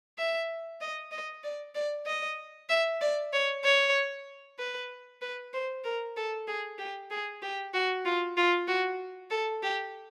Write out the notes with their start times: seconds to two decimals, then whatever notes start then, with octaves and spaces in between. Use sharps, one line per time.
0.18 E5
0.81 D#5
1.12 D#5
1.44 D5
1.75 D5
2.07 D#5
2.70 E5
3.01 D5
3.33 C#5
3.64 C#5
4.59 B4
5.22 B4
5.54 C5
5.84 A#4
6.16 A4
6.48 G#4
6.79 G4
7.11 G#4
7.43 G4
7.74 F#4
8.05 F4
8.37 F4
8.68 F#4
9.31 A4
9.63 G4